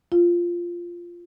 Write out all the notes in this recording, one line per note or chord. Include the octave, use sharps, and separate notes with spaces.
F4